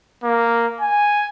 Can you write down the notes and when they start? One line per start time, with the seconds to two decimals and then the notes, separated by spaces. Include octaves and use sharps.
0.23 A#3
0.81 G#5